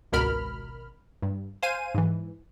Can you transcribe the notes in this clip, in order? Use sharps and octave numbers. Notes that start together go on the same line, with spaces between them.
G#1 C#2 B2 A#4 B5 F6
G2
C5 F5 G#5 D#7
G#2 E3